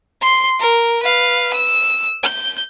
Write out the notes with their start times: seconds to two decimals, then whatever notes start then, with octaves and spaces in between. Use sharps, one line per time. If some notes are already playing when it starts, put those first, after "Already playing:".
0.22 C6
0.60 A#4
1.03 B4 F5
1.54 E6
2.23 G6